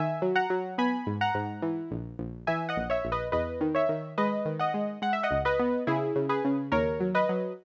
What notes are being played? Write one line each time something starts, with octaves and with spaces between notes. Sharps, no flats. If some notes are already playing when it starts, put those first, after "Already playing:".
Already playing: D#3 E5 G#5
F#3
F#5 A#5
F#3
B3 G#5 B5
G#2
F#5 A#5
G#2
E3
A#1
A#1
E3 E5 G#5
D#5 F#5
A#1
C#5 E5
A#1
B4 D#5
E2 B4 D#5
D#3
C#5 E5
D#3
G#3 B4 D#5
D#3
D#5 F#5
G#3
G#3 F#5
E5
D#5 F#5
C#2
B4 D#5
B3
C#3 E4 G#4
C#3
G#4 B4
C#3
D#2 A#4 C#5
F#3
B4 D#5
F#3